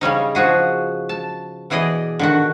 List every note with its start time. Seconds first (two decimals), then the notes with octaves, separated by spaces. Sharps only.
0.01 C#3 G3 C#4 D#4
0.35 F3 F#4 G#4
1.09 A5
1.70 B2 E3 G#4 D5 D#5
2.19 D3 D#3 F#4